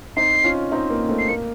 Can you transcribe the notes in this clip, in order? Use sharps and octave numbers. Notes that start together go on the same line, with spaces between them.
C4 D#4 C7
C#4 F4
C4 D#4
A#3
A3 C4
C7
A#3 C#7